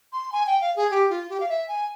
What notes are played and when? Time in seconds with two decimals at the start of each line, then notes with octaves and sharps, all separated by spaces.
0.13 C6
0.32 G#5
0.47 G5
0.61 F5
0.76 G#4
0.91 G4
1.10 F4
1.30 G4
1.40 F5
1.49 E5
1.68 G#5